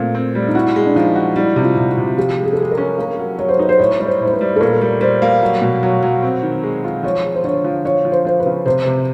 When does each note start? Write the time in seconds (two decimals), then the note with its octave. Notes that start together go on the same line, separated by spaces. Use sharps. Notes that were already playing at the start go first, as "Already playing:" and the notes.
Already playing: A#2 A3 A#3 C4
0.15 C4
0.35 G3
0.48 D#4
0.55 E4 F#4
0.76 G#3
0.86 D4
0.95 F3 D#4
1.15 F#4
1.36 G3 E4
1.56 C3
1.63 F4
1.77 C3
1.91 F#4
1.98 C3
2.17 F3 G4
2.37 G#3
2.44 G#4
2.53 A4
2.58 G#3 G#4
2.71 A#4
2.78 C#4
2.98 A#3 A#4
3.19 F#3
3.38 F#3 C#5
3.49 C5
3.58 D#4 B4
3.69 C5
3.79 A2 C#5
4.00 G3 C#5
4.06 C5
4.21 A2
4.27 C5
4.33 B4
4.41 G3
4.56 A4
4.60 A#2 A#4
4.81 G3
5.01 G3 C5
5.22 A#3
5.42 F#3
5.62 B2
5.83 F#3
6.03 F#3
6.23 C4
6.43 D#3
6.63 G#3
6.84 F4
7.03 F3 C#5
7.24 G#3
7.34 C5
7.44 D3 C#5
7.64 F3
7.85 F3 C#5
8.05 F3
8.12 C5
8.25 F3 C5
8.40 B4
8.46 C#3
8.66 C3 C5
8.87 C3